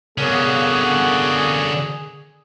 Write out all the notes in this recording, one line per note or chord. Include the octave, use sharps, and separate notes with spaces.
D3 A#3 B3 C#4 F#4 G#4